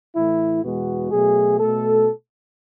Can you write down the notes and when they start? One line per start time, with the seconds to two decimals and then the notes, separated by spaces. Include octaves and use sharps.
0.16 A2 E3 A3 E4
0.64 E2 B2 G#3 B3 F#4
1.11 B2 F#3 A3 G#4
1.59 B2 A3 A4